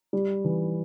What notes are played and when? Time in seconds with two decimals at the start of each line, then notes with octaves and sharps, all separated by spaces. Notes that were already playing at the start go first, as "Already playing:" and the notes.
0.13 G3
0.44 E3